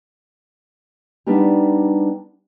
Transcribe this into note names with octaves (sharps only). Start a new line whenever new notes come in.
G3 B3 D4 D#4 G4